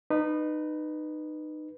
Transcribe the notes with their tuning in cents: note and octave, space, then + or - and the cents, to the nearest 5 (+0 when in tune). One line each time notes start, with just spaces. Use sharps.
D#4 -25 B4 +0